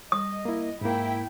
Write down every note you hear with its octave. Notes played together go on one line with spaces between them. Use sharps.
D#5 D#6
A#3 E4
G#2 A#3 E4 G5